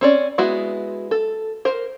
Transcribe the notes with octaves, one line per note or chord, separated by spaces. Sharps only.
C4 C#4 D5
G#3 B3 E4 F#4
A4
A#4 C5